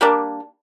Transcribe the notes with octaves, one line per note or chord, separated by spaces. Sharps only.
G3 A#3 D4